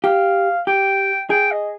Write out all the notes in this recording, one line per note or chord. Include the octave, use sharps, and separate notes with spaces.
G4 F5
G4 G5
G#4 G5
D#5